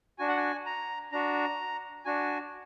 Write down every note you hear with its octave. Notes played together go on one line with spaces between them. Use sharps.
D4 F#4 G#5
F#5
G#5
A#5
D4 F#4 A#5
D4 F#4 G#5